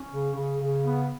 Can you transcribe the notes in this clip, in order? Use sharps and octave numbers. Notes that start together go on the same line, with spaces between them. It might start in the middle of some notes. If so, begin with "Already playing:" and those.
Already playing: C#4
C#3
C#3
C#3
B3